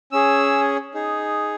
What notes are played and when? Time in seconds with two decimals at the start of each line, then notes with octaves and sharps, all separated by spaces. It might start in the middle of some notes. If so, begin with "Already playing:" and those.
0.12 C#4 G#4 E6
0.94 D#4 G#4